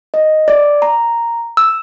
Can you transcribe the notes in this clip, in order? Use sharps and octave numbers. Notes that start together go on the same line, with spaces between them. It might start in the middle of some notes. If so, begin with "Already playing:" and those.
D#5
D5
A#5
E6